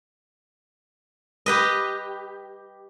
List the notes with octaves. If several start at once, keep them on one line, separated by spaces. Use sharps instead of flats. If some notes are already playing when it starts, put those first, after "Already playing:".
G4 B4 D#5